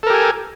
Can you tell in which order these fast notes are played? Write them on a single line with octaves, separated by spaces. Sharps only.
A4 A#4 G4 G#5